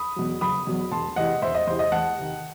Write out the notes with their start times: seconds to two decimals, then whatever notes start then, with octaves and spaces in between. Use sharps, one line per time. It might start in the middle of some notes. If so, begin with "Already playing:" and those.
Already playing: B5 D#6
0.16 E2 B2 F#3
0.41 F#1 B5 D#6
0.67 E2 B2 F#3
0.91 E1 A5 C6
1.16 E2 C3 E3 D#5 F#5
1.42 E1 C5 E5
1.55 D#5
1.67 E2 C3 E3 C5
1.79 D#5
1.92 E2 F#5 A5
2.18 C3 D#3